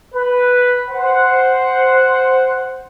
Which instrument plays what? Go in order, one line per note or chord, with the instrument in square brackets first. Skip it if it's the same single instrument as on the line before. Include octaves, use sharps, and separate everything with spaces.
[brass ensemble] B4
C5 F#5